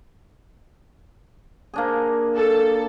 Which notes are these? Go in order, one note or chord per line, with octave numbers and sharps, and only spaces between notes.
A#3 D4 G#4
A4